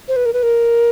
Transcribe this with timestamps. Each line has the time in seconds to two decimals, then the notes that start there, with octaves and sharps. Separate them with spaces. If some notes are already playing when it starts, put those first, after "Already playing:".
0.08 C5
0.16 B4
0.26 A#4
0.33 B4
0.43 A#4